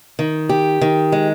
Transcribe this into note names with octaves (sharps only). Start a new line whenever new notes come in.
D#3
G4
D#3
G#3